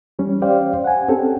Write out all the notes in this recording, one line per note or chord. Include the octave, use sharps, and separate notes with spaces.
E3 G3 C#4
C#4 G4 C5 D5 F5 G5
F#5 G#5
C4 C#4 G4 A4 G5